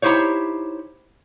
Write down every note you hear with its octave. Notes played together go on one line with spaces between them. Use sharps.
D#4 E4 G4 C5 C#5